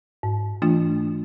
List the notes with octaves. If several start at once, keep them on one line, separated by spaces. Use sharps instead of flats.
G#2
E3 A3 D4 F4